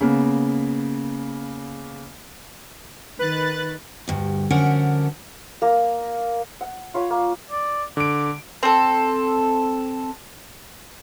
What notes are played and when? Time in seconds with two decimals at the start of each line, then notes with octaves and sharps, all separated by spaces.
0.01 C#3 A#3 B3
3.19 D#3 B4 F#6 A6
4.08 D2 G2
4.51 F#2 D3 F3 C#4 A#4 F#5
5.62 A#3
6.61 F#5
6.94 F4 C#5 B5
7.10 A#3
7.51 D5
7.97 D3 D6 D7
8.63 C4 A4